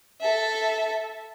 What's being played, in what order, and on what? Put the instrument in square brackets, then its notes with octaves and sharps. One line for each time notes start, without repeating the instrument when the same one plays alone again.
[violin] A4 E5